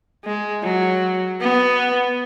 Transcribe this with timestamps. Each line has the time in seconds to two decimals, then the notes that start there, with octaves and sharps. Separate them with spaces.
0.25 G#3
0.63 F#3
1.41 B3